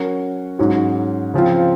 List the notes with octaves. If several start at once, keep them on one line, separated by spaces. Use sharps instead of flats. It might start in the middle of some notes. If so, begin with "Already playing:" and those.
Already playing: F#3 C#4 F#4 A#4
G#2 F#3 C#4 F#4
C#3 F3 C4 F4